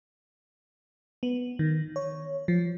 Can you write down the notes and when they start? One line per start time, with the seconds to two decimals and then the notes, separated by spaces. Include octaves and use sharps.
1.23 B3
1.59 D#3
1.96 C#5
2.48 F3